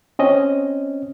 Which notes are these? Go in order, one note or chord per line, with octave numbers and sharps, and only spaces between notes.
C4 C#4 D#5